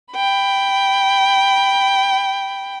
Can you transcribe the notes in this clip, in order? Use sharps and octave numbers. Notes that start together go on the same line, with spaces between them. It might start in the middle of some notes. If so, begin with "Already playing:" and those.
G5 B5